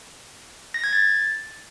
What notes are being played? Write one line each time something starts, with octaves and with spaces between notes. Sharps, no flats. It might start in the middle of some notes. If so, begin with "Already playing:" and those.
A#6
G#6
A6